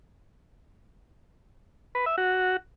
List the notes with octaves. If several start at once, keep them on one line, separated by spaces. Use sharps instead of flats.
B4
E5
F#4